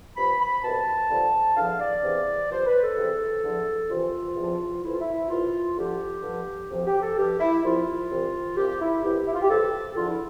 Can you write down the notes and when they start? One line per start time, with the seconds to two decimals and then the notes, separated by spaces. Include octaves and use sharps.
0.16 G2 F3 B5
0.40 B5
0.63 C2 B2 A5
1.10 G2 D3 F3
1.56 E2 D3 F3 F5
1.80 D5
2.02 E2 C3 E3
2.50 G2 F3 C5
2.65 B4
2.81 A4
2.96 E2 C3 E3
3.43 E2 D3 F3
3.89 C2 C3 E3 F4
4.36 E2 C3 F3
4.83 F2 E3 E4
4.92 F4
5.01 E4
5.29 C2 B2 F4
5.76 D2 D3 F3 G4
6.23 G2 D3 F3
6.70 D2 C3 F3
6.86 G4
7.01 A4
7.16 G2 F3 G4
7.40 E4
7.63 C2 C3 F3 F4
8.09 C2 C3 E3
8.56 C2 C3 F3 G4
8.80 E4
9.03 C2 B2 G4
9.27 E4
9.34 F4
9.42 G4
9.50 G2 F3 A4
9.97 E2 D3 F3 F4
10.09 E4